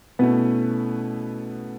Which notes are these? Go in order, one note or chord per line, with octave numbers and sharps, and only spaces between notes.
B2 A3 B3 C#4 E4 B4